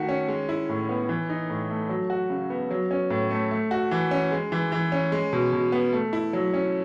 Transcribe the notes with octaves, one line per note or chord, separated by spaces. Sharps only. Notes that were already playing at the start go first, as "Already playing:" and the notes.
Already playing: D#3 A3 F#4
C#4
G#3
E4
A2
B3
E3
D#4
A2
A3
F#3
F#4
C#3
B3
F#3
C#4
A2
A3
A3
F#4
E3
C#4
G#3
E3
E3
C#4
G#3
B2
B2
B3
A3
E4
F#3
C#4